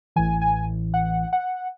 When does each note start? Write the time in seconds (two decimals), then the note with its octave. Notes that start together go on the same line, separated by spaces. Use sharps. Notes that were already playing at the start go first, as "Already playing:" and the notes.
0.16 A1 A2 E3 G#5
0.42 G#5
0.94 F#5
1.33 F#5